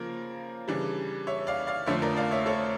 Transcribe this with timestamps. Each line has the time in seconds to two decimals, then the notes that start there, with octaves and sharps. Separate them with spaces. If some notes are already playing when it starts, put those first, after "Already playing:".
Already playing: C#3 F3 A#3 A#4
0.68 C#3 E3 G3 D4
1.27 C#5 E5
1.47 D5 F5
1.67 D5 F5
1.86 F2 D3 F3 A3 C#5 E5
2.02 A#4 D5
2.17 D5 F5
2.31 C#5 E5
2.46 A4 C#5